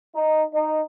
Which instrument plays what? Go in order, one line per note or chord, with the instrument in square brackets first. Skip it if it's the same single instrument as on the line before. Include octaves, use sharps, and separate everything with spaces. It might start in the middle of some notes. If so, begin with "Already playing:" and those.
[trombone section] D#4
D#4